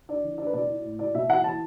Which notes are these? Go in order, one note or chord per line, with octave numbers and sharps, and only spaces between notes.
D4 D5
E3
D4 D5
B4
B2 D5
E4
A2
E4 D5
B2 E5
E3 F#5
E3 A5